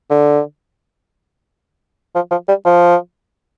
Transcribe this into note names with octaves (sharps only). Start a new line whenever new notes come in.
D3
F3
F3
G3
F3